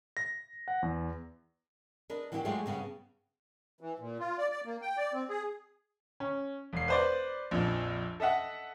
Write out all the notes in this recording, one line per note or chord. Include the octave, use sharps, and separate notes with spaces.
A#6
F#5
E2
D4 A#4 B4 D#5
E3 F#3 A#3 D4 F#4 G4
F#3 G#3 A3 D#4 F4 G4
G2 C#3 B3
E3
A#2
F4
D5
D5
A#3
G5
D5
C4
G#4
C#4
E1 C7
B4 C5 D5
A#1 F2 A#2
A4 D#5 E5 F#5